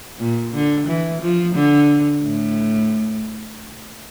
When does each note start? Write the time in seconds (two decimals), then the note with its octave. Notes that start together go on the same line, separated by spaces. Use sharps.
0.19 A#2
0.54 D3
0.87 E3
1.22 F3
1.55 D3
2.23 A2